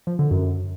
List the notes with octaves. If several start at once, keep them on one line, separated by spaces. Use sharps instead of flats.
F3
D3
F#2